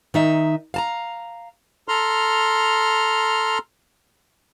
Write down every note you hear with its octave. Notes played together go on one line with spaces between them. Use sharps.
D#3 D#4 E5
F5 A5 A#5
A4 A#5 C6 F6